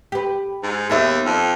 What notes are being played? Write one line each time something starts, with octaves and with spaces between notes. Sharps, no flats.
G4 B4
G#2
D#2 B3 E5
F2